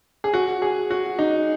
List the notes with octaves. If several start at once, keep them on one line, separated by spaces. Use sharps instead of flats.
G#4
F#4
G#4
F#4
D#4